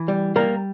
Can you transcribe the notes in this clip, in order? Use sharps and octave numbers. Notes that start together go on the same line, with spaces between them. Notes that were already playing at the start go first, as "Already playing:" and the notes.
Already playing: E3
G3
G3 A#3 A#4